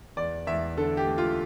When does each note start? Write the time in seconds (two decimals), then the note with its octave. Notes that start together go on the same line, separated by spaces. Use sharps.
0.16 E2 D5
0.47 E2 E5
0.77 D3 A4
0.97 G4
1.07 A3
1.18 F4